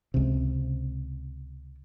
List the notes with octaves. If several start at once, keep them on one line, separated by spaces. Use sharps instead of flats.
C#2 C3